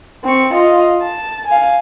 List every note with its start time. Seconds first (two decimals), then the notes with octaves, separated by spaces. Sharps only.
0.24 C4 C#6
0.54 F4 D#5
1.02 A5
1.47 F5 G#5